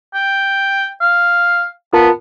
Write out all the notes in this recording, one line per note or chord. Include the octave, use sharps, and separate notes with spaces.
G5
F5
B3 F4 A#4 A5